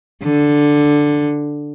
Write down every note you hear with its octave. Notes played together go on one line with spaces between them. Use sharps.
D3